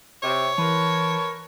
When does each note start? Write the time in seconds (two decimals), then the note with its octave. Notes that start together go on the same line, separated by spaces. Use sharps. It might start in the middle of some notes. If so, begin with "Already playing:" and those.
0.23 C3 C#5
0.58 E3 A#4 B4 A5 C6